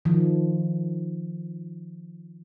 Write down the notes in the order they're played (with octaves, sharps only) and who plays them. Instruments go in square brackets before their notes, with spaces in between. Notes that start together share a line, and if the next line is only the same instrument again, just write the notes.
[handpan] D#3 F3